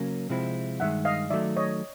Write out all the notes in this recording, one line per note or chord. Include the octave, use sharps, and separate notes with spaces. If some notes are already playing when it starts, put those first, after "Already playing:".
Already playing: C#3 F#3 A#3 C#4
C3 F3 G#3 C4 E4
G2 D#3 G#3 E5 F#5
D#5 F5
D#3 F#3 A3 D5 E5
C#5 D#5